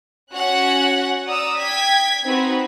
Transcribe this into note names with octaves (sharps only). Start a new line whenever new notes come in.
C#4 F#4 C#5 F#5 F#6
D5 A#5 D#6 E6
G5 G#6 B6
C4 D#4 F#4 B4